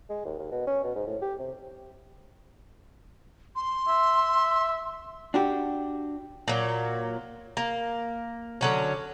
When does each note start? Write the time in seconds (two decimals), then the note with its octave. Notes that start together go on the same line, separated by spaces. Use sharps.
0.10 G#3
0.25 D#2
0.39 D#2
0.52 B2
0.67 C#4
0.84 B2
0.95 G#2
1.07 A2
1.22 G4
1.40 C3
3.56 C6
3.88 E5
5.34 D4 F#4 G4
6.48 A#2 F#3
7.57 A#3
8.61 D3 F#3 C#4